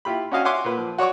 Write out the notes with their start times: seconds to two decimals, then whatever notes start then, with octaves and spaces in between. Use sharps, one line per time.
0.05 E4 F4 G4 B5
0.32 C#4 D4 F#4 D#5 F5 G#5
0.45 C#5 E5 F#5 G#5 C6 D6
0.64 A#2 B4
0.78 F3
0.98 F#4 C#5 D5 C#6 D6